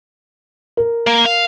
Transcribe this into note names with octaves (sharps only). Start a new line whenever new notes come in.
A#4
A#3
F5